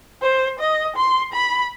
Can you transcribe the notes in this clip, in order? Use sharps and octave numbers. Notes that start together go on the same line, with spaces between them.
C5
D#5
C6
B5